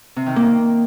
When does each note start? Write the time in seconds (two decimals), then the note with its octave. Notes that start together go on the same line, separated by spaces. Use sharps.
0.16 C3
0.26 D#3
0.36 A#3